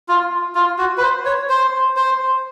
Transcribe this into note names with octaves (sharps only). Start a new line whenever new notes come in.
F4
F4
F#4
B4
C5
C#5
C5
C5